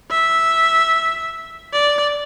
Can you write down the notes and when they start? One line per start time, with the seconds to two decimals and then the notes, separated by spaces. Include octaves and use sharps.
0.11 E5
1.73 D5